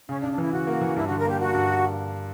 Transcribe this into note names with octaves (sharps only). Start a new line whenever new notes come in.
C#3 C#4
D4
C#3
D4
E3 E4
C#3 F#4
A#3
E3
G2 E4
D3 F#4
A#4
A#3 G4
A#3 F#4
G2